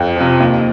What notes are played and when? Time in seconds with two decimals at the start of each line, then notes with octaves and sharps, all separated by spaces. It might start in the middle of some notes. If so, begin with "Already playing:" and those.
Already playing: F2
0.16 C3 F3
0.40 D#2